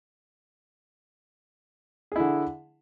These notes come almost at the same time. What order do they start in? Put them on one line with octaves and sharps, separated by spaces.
G#4 E4 D3